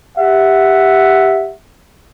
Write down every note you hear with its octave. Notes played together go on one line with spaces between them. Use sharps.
G4 E5 F#5